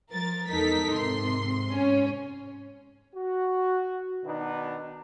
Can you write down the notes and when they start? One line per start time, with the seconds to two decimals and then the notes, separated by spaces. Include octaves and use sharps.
0.11 F3 A#4 A6
0.49 E2 G#3 D#4 A4 A#4 B6
0.92 G#2 C3 C6
1.73 G#2 C#4
3.15 F#4
4.25 B2 D#3 B3 D4 D#4